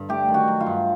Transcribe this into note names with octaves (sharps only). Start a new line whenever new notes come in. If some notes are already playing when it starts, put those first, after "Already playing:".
Already playing: G2 D3
A3 G4
D#3
F#4
F#3
F4
G2